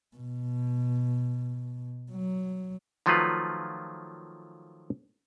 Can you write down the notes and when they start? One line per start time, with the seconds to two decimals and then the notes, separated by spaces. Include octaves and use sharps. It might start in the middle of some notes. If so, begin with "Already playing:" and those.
0.16 B2
2.12 F#3
3.06 D#3 F3 F#3 A3 F4 B4